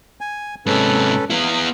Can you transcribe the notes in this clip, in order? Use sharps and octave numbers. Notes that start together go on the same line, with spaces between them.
G#5
G#2 C3 C#4 A4 B4
B3 E4 F5